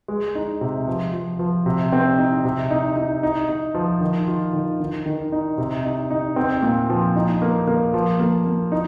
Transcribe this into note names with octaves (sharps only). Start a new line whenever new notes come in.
G#3
D#4
C3
F3
F3
F3
C3
C4
D#4
C3
D#4
D#4
D#4
D#4
F3
D#3
F4
D#3
D#3
D#3
D#4
C3
D#4
D#4
C4
A#2
F3
D#4
A#3
A#3
F3
A#3
A#3
D#4